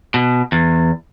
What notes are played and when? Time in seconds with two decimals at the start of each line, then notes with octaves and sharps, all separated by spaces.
0.14 B2
0.52 E2